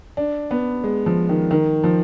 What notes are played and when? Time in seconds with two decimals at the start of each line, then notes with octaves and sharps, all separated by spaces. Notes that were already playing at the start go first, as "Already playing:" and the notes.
0.17 D4
0.51 B3
0.84 G#3
1.06 F3
1.29 D#3
1.51 D#3
1.84 F3